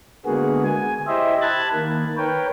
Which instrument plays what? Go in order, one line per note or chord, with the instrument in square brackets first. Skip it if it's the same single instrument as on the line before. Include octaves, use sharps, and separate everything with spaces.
[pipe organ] D3 G#3 A#3 B3 F#4 G#4
G#5
E4 G4 C5 D#5 E5
A5 B5 F#6 G#6 A6
D#3 A#3
A#4 B4 C#5 G5